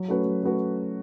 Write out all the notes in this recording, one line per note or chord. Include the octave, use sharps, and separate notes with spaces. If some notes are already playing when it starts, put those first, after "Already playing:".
Already playing: F#3
A3 C#4 F#4 B4
F#3
A3 C#4 F#4 B4